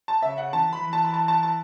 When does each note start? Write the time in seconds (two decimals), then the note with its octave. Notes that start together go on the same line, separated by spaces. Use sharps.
0.08 A5
0.22 C#3 E5
0.38 F#5
0.53 E3 A5
0.73 B5
0.82 E3
0.93 A5
1.05 B5
1.14 A5
1.28 A5
1.43 A5